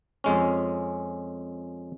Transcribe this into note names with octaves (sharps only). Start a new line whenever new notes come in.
F2 G#3 C#4